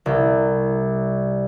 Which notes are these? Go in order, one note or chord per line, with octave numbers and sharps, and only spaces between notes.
C2